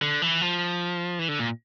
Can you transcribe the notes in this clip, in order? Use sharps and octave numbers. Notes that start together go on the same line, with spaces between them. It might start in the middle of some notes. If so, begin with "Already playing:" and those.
D3
E3
F3
E3
D3
A#2